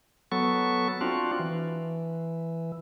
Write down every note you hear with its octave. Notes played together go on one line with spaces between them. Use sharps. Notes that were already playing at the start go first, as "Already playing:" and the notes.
F#3 B3 A4 C#6
C4 D4 F4 F#4
E3